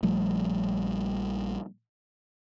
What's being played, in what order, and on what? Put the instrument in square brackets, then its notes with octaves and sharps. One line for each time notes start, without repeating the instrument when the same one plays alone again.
[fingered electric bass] A#1 F3 G3 A3